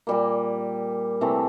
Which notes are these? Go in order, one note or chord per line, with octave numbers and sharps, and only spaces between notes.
A#2 G3 A#3
C3 E3 A3 C4